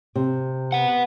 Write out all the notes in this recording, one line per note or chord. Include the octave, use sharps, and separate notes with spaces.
C3
B3 F#5